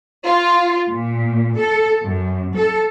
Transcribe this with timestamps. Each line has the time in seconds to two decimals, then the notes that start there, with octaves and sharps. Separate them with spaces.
0.24 F4
0.89 A#2
1.57 A4
2.04 F#2
2.55 A4